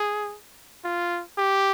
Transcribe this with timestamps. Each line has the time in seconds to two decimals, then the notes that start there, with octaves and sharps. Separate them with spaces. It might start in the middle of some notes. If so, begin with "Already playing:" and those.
Already playing: G#4
0.85 F4
1.38 G4